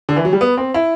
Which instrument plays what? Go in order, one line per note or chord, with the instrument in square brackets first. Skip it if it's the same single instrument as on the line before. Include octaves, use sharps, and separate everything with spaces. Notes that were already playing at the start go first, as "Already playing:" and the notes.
[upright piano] D3
E3
F#3
G3
B3
C4
E4